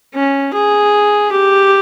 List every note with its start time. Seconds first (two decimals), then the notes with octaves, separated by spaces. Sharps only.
0.14 C#4
0.54 G#4
1.32 G4